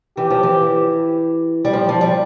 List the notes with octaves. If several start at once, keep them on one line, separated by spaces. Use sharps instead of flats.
E3 G4
F3
E3
G3
F3 G4
F3
G3